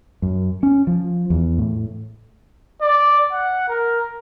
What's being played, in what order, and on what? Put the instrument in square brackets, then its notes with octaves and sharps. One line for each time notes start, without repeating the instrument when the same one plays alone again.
[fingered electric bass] F#2
C#4
F3
E2
A2
[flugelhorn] D5
F#5
A#4